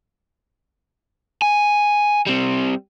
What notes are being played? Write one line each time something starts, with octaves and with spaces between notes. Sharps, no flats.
G#5
G3 C4